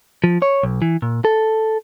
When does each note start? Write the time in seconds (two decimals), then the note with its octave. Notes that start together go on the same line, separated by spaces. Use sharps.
0.24 F3
0.42 C#5
0.63 B1
0.82 E3
1.02 A#2
1.25 A4